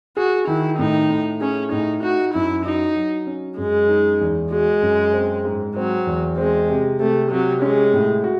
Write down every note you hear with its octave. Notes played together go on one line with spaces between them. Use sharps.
F#4 G#4
D#3 E4
A2 D#4
A2
C#4 G#4
A2 D#4
D#4 F#4
F#2 E4
D#4 F#4
F#3
C#4
F#2 G#3
D#4
E2
G#3 F#4
F#2
C4
G#2
F#3 C4
E2
G#3 C4
C3
C3 A3
C3 F#3
G#3 C#4
A2
F#4